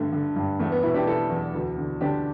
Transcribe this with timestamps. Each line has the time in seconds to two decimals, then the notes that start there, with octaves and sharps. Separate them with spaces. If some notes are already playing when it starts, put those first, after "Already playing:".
Already playing: G2 D3 A3
0.12 D3
0.36 G2
0.59 E2 A3
0.72 B3
0.83 B2 B3 E4
0.94 D4 G4
1.07 B2 E4 A4
1.30 E2
1.54 D2
1.78 D3
2.01 D3 D4 G4